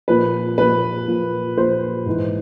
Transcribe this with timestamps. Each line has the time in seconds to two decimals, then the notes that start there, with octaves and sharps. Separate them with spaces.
0.08 A#2 F3 B4
0.58 A#2 F3 B4
1.08 A#2 F3
1.57 A#2 F3 C5
2.06 G#2 E3